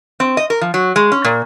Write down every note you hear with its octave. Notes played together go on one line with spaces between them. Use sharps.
C4
D#5
A#4
F3
F#3
G#3
C#4
A#2